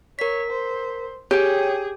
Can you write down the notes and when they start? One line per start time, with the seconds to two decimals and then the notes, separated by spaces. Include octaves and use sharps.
0.19 A#4 C#5 B6
0.50 C5
1.31 G4 G#4 C#5 G5